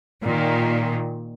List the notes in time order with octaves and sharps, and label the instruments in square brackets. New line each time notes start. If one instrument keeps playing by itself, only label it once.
[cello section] A#2 D#3